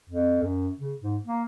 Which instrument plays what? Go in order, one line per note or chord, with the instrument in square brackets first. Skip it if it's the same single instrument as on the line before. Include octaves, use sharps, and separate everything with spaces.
[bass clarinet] F2
F#2
C#3
G#2
A#3